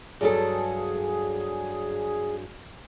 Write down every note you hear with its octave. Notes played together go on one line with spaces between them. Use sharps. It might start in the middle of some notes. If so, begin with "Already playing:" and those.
G2 F#3 G#4 A4